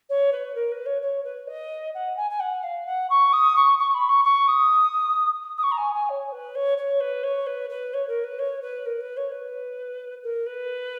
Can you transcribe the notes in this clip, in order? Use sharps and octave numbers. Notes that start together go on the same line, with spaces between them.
C#5
B4
A#4
B4
C#5
C#5
B4
D#5
F#5
G#5
G#5
F#5
F5
F#5
C#6
D#6
C#6
C#6
B5
C#6
C#6
D#6
D#6
C#6
A#5
G#5
G#5
C#5
B4
C#5
C#5
B4
C#5
B4
B4
C#5
A#4
B4
C#5
B4
A#4
B4
C#5
B4
A#4
B4